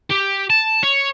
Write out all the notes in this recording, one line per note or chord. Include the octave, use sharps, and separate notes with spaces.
G4
A5
C#5